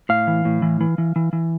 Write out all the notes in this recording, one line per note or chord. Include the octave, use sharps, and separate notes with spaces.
A2 F5
E3
A2
E3
E3
E3
E3
E3